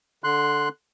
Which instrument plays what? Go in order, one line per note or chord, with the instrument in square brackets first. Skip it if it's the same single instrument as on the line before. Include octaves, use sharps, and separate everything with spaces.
[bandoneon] D3 C6 F#6